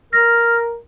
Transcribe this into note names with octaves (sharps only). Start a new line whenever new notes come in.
A#4 F6 A#6